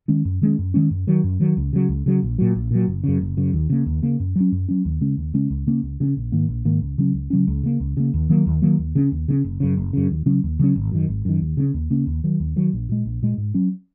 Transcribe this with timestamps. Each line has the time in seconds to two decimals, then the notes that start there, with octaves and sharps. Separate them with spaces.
0.08 D#3 G#3 C#4
0.25 F#2
0.41 D#3 G#3 C#4
0.59 F#2
0.74 D#3 G#3 C#4
0.91 F#2
1.07 D#3 F#3
1.24 F#2
1.40 D#3 F#3
1.57 C#2
1.73 C#3 F#3
1.89 C#2
2.06 C#3 F#3
2.23 A#1
2.38 A#2 F#3
2.55 A#1
2.71 A#2 F#3
2.87 F#1
3.04 F#2 C#3
3.21 F#1
3.37 F#2 C#3
3.53 D#2
3.70 C#3 A#3
3.86 D#2
4.02 C#3 A#3
4.20 F#2
4.36 F#3 C#4
4.52 F#2
4.69 F#3 C#4
4.85 D#2
5.01 C#3 G#3 C#4
5.17 D#2
5.34 C#3 G#3 C#4
5.50 C#2
5.67 C#3 A#3 C#4
5.83 C#2
6.00 C#3 A#3 C#4
6.17 A#1
6.32 G#2 D#3 A#3
6.49 A#1
6.65 G#2 D#3 A#3
6.81 C#2
6.98 C#3 F#3 C#4
7.14 C#2
7.30 C#3 F#3 C#4
7.47 C#2
7.63 C#3 A#3
7.80 C#2
7.97 C#3 A#3
8.14 D#2
8.29 D#3 F#3 A#3
8.46 D#2
8.62 D#3 F#3 A#3
8.79 D#2
8.95 C#3 A#3 C#4
9.12 D#2
9.28 C#3 A#3 C#4
9.44 F#1
9.60 F#2 C#3
9.77 F#1
9.93 F#2 C#3
10.11 D#2
10.26 C#3 F#3 C#4
10.43 D#2
10.59 C#3 F#3 C#4
10.76 G#1
10.91 F#2 D#3
11.08 G#1
11.25 F#2 D#3
11.41 D#2
11.57 C#3 A#3 C#4
11.74 D#2
11.90 C#3 A#3 C#4
12.07 D#2
12.24 D#3 F#3
12.40 D#2
12.56 D#3 F#3
12.73 A#1
12.89 A#2 G#3
13.05 A#1
13.22 A#2 G#3
13.38 G#2
13.54 F#3 C#4